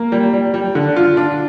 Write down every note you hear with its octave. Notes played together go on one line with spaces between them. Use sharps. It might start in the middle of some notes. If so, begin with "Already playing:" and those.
Already playing: A#3
G3
G3
G3
D3
F4
D4